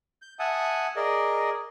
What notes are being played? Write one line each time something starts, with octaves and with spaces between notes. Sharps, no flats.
G6
E5 F#5 G#5 A5 D#6
G#4 A#4 D5 D#5